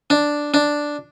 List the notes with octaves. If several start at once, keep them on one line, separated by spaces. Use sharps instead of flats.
D4
D4